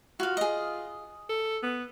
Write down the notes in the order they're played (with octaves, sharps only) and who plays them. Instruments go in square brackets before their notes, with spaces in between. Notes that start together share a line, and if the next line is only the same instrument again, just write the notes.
[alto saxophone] F4 [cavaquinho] F#4 F5
[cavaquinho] G#4 D#5
[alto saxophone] A4
B3